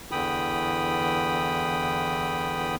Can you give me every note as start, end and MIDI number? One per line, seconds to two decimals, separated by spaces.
0.11 2.76 40
0.11 2.76 50
0.11 2.76 52
0.11 2.76 79
0.11 2.76 83
0.11 2.76 87